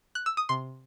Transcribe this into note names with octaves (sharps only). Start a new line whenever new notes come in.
F#6
E6
D#6
C3 C6